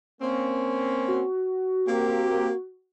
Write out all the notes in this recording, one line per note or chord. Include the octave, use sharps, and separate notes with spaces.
A#3 C4 C#4
F#4
A#3 C4 G4